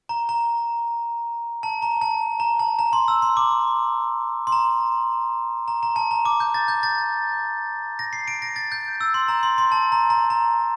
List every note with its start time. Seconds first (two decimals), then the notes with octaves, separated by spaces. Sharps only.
0.09 A#5
0.29 A#5
1.63 A5
1.82 A#5
2.01 A5
2.40 A#5
2.60 A5
2.79 A#5
2.93 C6
3.08 E6
3.22 C6
3.37 D6
4.47 C6
4.52 A#5
5.68 A#5
5.83 A#5
5.96 A5
6.11 A#5
6.25 D6
6.40 G6
6.54 A6
6.68 G6
6.83 A6
7.99 A#6
8.13 C7
8.28 D7
8.42 A#6
8.56 A6
8.72 G6
9.01 E6
9.14 C6
9.28 A#5
9.43 C6
9.58 C6
9.72 A5
9.92 A#5
10.10 A#5
10.30 A#5